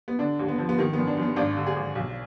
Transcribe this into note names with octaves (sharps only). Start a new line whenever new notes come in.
B3
D3 D4
D#2
B3
F3
B3
D#3 A#3
B3
F#2
D4
F#2
B3
G#1 D4
D3
G#4
G#1
B1